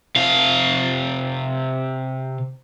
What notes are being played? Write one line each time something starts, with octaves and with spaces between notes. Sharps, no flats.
C3 F5